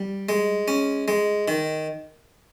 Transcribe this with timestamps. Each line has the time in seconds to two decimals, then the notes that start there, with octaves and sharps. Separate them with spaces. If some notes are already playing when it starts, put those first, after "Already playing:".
Already playing: G3
0.29 G#3
0.68 C#4
1.08 G#3
1.48 D#3